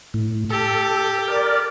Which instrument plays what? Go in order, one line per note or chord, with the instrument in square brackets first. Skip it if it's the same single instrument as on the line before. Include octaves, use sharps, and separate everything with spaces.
[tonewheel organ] A2
[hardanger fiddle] G4 [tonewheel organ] A4
[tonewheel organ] A#4 D5